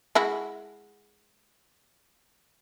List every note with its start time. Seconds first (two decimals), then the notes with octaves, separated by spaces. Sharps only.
0.15 G#3 E4 F#4